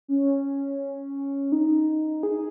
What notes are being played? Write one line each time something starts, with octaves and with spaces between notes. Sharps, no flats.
C#4
D#4
G#4